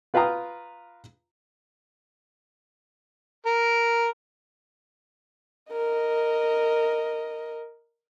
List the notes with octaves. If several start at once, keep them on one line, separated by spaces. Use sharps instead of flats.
F4 B4 F5 G5 A#5 D#6
A#4
A#4 D#5